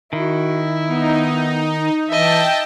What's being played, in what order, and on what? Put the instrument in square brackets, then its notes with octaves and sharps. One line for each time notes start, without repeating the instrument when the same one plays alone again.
[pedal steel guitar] D#3 [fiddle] E4 [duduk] F#4
[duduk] B3 [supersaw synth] D#4
[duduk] E3 [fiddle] D#5 E5 [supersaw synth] G5 A5